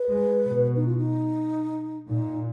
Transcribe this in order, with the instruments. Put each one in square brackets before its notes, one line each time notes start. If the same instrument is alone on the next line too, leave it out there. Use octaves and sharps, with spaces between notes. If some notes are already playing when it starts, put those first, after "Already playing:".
Already playing: [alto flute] B4
[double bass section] G#3
B2
[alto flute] D#4
F4
D#4
[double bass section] A#2 [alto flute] D#4